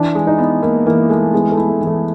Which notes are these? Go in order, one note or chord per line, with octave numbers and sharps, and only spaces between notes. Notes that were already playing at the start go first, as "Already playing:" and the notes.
Already playing: E3 D4
G#3
D#4
B3
A#3 E4
E3 A#3
G#3 A3
G#3 B3
A3
E4
A3
E3
A3